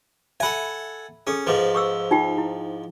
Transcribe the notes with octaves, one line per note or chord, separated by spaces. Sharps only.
A4 E5 F#5 G#5 B5
C#4 G#4 A4
G#2 F3 B4 D6
C#6 D6 E6
D#4 F4 G5
E4